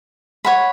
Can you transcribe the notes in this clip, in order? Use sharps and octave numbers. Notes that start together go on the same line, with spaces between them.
C#5 F#5 B5